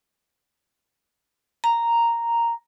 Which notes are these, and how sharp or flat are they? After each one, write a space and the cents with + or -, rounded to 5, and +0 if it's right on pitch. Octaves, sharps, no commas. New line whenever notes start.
A#5 -5